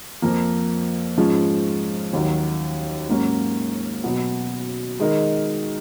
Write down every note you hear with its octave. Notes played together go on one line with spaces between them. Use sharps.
F2 F3 A#3
G#2 F3 G#3 C#4 F4
D#2 D#3 F#3
G#2 F#3 A#3 C#4
B2 F#3 B3
D#3 G#3 D#4 A#4 D#5